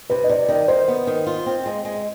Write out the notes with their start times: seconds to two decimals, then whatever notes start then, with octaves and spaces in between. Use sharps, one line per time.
0.10 C3 B4
0.24 D#5
0.29 C3 D5
0.49 D#3 D5
0.68 D#3 C5
0.88 B3
1.07 D#3
1.27 F4
1.46 C4
1.66 G#3
1.85 G#3